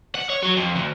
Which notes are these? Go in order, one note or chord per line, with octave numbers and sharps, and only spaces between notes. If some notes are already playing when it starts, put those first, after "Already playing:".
F#5
C#5
F#3
F2
D2